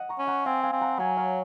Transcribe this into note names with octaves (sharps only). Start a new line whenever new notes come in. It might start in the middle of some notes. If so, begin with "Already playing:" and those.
Already playing: D#5 F#5
A#5 C#6
C#4
F#5 A#5
C4 F5 G#5
F5 G#5
C4
F#5 A#5
F#3 F5 G#5
C#5 F5